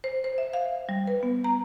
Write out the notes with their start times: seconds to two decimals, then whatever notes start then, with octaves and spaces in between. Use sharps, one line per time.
0.04 C5
0.24 C5
0.38 E5
0.53 F5
0.89 G3
1.07 B4
1.23 B3
1.44 A#5